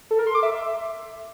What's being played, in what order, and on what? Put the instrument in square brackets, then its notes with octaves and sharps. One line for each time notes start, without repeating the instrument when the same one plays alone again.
[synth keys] A4
A#4
C6
D6
E5